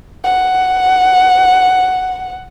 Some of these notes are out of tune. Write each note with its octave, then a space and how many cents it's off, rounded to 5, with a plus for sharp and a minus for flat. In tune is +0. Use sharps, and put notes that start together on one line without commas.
F#5 +5